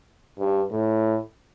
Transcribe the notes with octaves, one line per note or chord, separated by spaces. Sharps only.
G2
A2